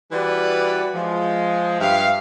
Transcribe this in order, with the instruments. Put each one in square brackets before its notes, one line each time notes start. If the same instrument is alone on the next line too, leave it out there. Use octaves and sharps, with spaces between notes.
[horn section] E3 G3 F#4 B4 D5
F3 G#3
G2 G4 E5 F5